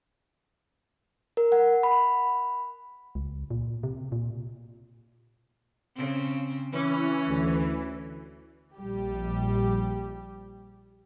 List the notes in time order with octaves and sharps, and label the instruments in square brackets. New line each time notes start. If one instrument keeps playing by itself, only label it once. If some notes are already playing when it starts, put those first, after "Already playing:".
[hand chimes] A#4
F#5
B5
[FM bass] C#2
A#2
C3
A#2
[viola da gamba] C#3 C4
[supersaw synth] E3 [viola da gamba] C#4
[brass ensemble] D2
[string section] A#1 G3 G4